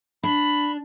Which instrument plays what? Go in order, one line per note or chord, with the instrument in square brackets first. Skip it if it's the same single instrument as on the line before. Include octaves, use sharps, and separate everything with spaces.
[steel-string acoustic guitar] D4 [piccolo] B5